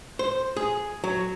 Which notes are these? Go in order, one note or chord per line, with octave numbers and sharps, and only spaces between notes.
C5
G#4
F#3